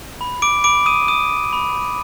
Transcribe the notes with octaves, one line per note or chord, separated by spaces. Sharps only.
B5
D6 D7
B5 D6 D7
D#6 D#7
D#6 D#7
B5